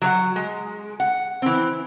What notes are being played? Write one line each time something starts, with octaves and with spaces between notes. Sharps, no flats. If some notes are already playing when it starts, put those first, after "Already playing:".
F#3 C#5 F#5
G#3
F#5
E3 C4